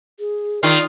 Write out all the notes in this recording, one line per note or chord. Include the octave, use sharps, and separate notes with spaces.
G#4
D#3 F4 D5